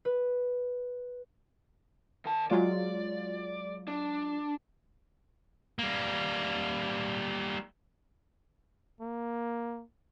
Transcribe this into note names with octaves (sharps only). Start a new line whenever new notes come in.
B4
D#3 A5
F#3 G#3 F4 D5
D4
G3 A#3
A#3